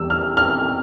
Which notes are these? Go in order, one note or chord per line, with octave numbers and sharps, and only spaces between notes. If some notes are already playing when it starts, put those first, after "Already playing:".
Already playing: E2 E3 G3 E6
F6
F6